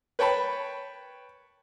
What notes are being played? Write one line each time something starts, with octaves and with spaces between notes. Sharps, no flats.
B4 C#5 G5 A5 B5